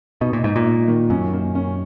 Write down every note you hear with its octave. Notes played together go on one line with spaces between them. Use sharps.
B2 D#4
A#2
G#2 D#4
A#2
D#4
D#3
F#2 C#4
A#3
C#4